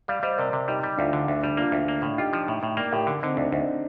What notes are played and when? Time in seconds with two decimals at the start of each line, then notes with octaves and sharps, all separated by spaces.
0.08 G3 D5 F5
0.23 G3 C5 D#5
0.38 C3 A#4 D5
0.53 C3
0.68 G3 D#4 G4
0.83 G3
0.97 D2 D4 F4
1.13 D3
1.28 D2 D4
1.42 G3 D4
1.57 A#3 D4 F4
1.72 D2
1.88 A#3
2.02 A2
2.17 D#4 F4 G4
2.33 F3
2.48 A2
2.63 A2
2.77 A#3 A#4 D5
2.92 A2 G4 A#4
3.07 D3
3.22 D3 C4 D#4
3.37 D2 D4
3.52 D2 C4 D#4